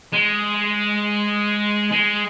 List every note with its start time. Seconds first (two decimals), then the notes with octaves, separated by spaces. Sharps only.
0.13 G#3
1.92 G#3